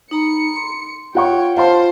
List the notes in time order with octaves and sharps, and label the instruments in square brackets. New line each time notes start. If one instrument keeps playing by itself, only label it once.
[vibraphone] D#4 A#5 B5 [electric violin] C#7
[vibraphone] C6
[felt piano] F4 F#5 C#6 [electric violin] C#5 G5
[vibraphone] F4 [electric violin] C5 [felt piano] F5 A5 C6